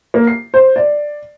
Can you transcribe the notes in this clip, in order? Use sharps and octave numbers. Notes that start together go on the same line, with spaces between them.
A#3
C7
C5
D5